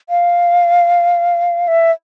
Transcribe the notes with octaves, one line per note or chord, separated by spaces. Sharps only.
F5
E5